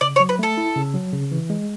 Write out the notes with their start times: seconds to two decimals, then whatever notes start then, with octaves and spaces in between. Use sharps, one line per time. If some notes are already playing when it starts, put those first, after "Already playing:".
0.01 C#3 D5
0.16 C#5
0.20 F#3
0.29 B4
0.39 A3 A4
0.57 E4
0.76 C#3
0.94 F#3
1.13 C#3
1.32 E3
1.50 G#3